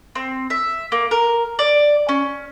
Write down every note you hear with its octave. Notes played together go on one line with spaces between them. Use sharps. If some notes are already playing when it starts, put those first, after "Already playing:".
C4
E5
A#3
A#4
D5
C#4